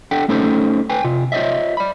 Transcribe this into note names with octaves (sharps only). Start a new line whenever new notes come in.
D4 A4 F#5 G5
A3 C#4 D#4 A4 C5
B4 G5 G#5
C3 F4
F4 C5 C#5 D#5 E5
D5 B5